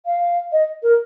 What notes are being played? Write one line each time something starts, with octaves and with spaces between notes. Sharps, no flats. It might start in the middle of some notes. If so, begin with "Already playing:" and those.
F5
D#5
A#4